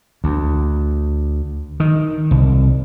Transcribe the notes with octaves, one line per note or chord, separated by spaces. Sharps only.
D2
D#3
C2